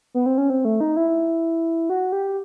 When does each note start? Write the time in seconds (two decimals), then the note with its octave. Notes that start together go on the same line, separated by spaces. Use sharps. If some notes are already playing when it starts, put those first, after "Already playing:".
0.14 B3
0.26 C4
0.38 C#4
0.50 C4
0.65 A3
0.81 D#4
0.96 E4
1.90 F#4
2.12 G4